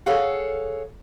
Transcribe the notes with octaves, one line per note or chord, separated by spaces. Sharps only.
G#4 A4 C#5 F5 F#5